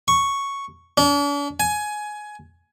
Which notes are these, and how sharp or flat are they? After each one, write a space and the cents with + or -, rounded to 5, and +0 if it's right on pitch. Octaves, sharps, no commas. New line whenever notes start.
C#6 +0
D4 -45
G#5 +15